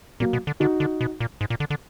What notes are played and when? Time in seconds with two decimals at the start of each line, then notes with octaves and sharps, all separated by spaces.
0.20 A#2 F#3 A#3
0.33 B2
0.47 D3
0.60 D3 D#4 F#4
0.80 D3
1.01 B2
1.20 A#2
1.41 G#2
1.50 A#2
1.60 D3
1.70 D3